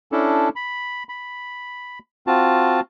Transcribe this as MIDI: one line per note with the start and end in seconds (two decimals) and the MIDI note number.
0.12 0.49 61
0.12 0.49 62
0.12 0.49 64
0.12 0.49 69
0.56 1.03 83
1.09 1.99 83
2.27 2.80 60
2.27 2.80 65
2.27 2.80 66
2.27 2.80 81